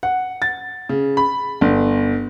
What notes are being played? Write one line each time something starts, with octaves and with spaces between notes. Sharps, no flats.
F#5
A6
C#3
B5
G1